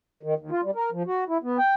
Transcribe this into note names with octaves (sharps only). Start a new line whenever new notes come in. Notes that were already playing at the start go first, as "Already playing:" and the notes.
D#3
D#2
F4
G3
A#4
F3
F#4
E4
B3
G5